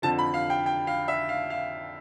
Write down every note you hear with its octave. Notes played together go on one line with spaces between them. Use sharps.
F2 D3 F3 A5
B5
F5
G5
G5
F5
E5
F5
F5